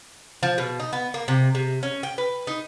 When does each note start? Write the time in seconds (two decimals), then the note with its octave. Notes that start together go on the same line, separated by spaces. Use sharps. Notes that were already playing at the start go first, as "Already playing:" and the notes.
0.43 F3
0.58 B2
0.80 D#4
0.93 B3
1.14 A#3
1.28 C3
1.55 C3
1.83 C#4
2.03 G5
2.18 B4
2.47 D#4